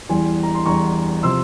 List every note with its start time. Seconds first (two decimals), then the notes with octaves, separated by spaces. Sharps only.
0.09 E2 E3 G3 G#5 C6
0.43 A#5
0.55 C6
0.66 E2 E3 G3 A#5 C#6
1.23 C3 F3 C6 E6